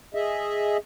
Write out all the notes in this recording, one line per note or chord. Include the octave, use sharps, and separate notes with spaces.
G#4 D#5 E5